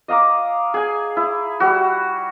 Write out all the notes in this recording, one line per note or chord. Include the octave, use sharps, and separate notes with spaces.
D#5 F5 A#5 D6
G#4 G#5
E4
G3 F#4